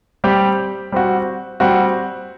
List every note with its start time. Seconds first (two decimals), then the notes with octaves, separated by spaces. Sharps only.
0.24 G3 C4 G4
0.92 G3 C4 F#4
1.60 G3 C4 F#4